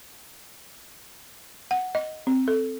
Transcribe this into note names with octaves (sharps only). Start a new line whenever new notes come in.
F#5
D#5
C4
A4